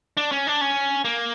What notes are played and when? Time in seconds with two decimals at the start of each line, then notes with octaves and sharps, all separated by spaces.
0.17 D4
0.32 C#4
0.47 D4
0.61 C#4
1.05 A#3